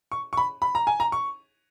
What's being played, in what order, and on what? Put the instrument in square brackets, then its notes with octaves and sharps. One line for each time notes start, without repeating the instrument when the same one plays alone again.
[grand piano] C#6
C#6
B5
B5
A#5
G#5
A#5
C#6